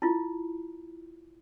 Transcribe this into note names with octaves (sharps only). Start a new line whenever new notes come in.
E4 F4